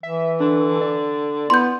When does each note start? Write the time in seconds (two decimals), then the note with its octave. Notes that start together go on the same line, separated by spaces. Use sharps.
0.03 E3 E5
0.40 D3 D4
0.81 D5
1.50 B3 E4 C6 G6